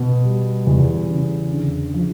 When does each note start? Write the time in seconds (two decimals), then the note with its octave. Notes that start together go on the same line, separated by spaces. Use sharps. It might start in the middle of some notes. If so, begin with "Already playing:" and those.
Already playing: B2
0.24 G3
0.67 E2
1.09 C#3
1.52 D3
1.94 F3